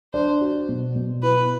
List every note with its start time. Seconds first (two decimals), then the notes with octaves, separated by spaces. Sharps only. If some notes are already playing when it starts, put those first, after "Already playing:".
0.14 D4 C5
0.41 F#4
0.69 B2
0.96 B2
1.23 E4 B4